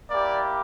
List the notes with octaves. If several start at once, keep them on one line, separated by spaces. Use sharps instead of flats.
A#3 E4 G4 D5